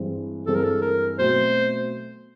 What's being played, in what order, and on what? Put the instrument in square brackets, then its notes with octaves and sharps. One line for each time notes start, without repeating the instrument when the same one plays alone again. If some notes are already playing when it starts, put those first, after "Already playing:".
Already playing: [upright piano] G2 E3 G#3 C4
[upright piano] G2 E3 G#3 C4 [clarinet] A4
[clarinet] A#4
A4
A#4
[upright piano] B2 F#3 A3 C4 [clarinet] C5